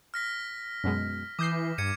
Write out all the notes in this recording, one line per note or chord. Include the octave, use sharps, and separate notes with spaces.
F6 A#6 B6
F#2 B2 G#3
E3 D6 D#6 G6 C7
G2 G#6 C#7 D#7